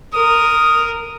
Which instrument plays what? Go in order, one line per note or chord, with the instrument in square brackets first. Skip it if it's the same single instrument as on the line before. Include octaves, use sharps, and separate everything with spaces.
[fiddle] A#4 [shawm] D#6